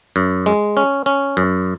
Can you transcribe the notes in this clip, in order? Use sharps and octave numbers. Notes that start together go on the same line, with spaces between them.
F#2
G#3
C#4
C#4
F#2